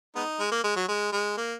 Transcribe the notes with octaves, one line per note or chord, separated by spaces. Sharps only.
G#3 B3 D#4
G#3
A#3
G#3
F#3
G#3
G#3
A#3